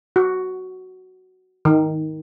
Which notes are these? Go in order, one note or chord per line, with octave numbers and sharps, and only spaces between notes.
F#4
D#3